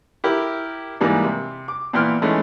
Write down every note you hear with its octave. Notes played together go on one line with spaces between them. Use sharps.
E4 G4 A#4
G#2 E3 G3 A#3
C3
D6
A#2 E3 B3 G5 C6 F6
E3 G#3 A3 B3 C#4 D#4